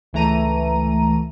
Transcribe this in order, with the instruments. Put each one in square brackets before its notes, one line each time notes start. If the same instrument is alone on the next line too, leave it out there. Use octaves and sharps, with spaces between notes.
[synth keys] C#2 E3 A3 A#5 D#7